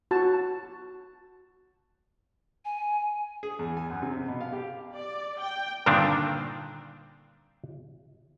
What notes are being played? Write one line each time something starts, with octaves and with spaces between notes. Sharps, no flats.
F#4 A5
G#5
G#4
E2
G#5
F#2
C3
B2
F5
G4
D5
G5
G2 A#2 D3 D#3 C4 D4